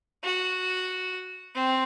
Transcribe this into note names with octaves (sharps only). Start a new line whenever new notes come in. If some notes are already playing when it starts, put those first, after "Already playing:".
F#4
C4